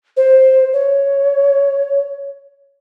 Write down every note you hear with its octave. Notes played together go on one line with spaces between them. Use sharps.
C5
C#5